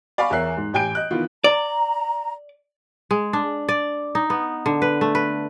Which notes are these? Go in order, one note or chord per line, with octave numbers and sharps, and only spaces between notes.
D5 F5 G#5 B5 C#6
E2 A#4 C#5 E5 F#6 C7
G#2
A1 G4 G5 G#5 G6 D7
D#5 F#6
D#3 E3 B3 F4
D5 A#5
G#3
D4
D5
D#4
B3
D3
B4
A3
B4